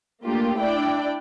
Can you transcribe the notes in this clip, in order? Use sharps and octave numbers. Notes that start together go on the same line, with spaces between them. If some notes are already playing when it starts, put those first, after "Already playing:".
A3 A#3 D4 F4 G4
D4 E4 D5 G5